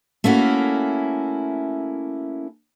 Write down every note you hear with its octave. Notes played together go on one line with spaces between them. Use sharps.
A3 A#3 C#4 E4 F#4